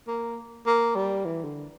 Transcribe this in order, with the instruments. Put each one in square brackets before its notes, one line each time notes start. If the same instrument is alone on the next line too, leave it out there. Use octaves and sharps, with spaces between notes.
[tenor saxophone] A#3
A#3
G3
E3
D3